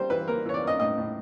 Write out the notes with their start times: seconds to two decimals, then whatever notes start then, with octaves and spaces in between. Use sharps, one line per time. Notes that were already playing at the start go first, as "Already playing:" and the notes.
Already playing: G3 A#3 C5
0.10 E3 B4
0.28 A#3 A#4
0.46 E3 C#5
0.54 D5
0.63 A#3 D#5
0.80 A2 D#5
0.98 A2